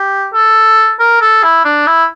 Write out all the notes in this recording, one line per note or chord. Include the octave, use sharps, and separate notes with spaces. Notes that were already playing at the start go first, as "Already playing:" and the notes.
Already playing: G4
A4
A#4
A4
E4
D4
E4